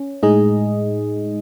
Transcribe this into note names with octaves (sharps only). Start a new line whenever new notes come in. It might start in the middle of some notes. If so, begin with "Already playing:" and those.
Already playing: C#4
A2 G#3 D#4 G#4 D#5